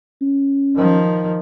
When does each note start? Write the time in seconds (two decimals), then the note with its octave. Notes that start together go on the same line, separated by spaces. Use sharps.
0.21 C#4
0.76 D#3 F3